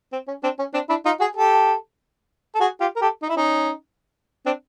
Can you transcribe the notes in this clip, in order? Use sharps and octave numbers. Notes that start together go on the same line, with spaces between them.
C4
C#4
C4 D4
C#4
C4 D4
D4 E4
D#4 F4
F#4 G#4
G4 A4
A4
F#4 G#4
F4 G4
A#4
G4 A4
D#4
E4
C#4 D#4
C4 D4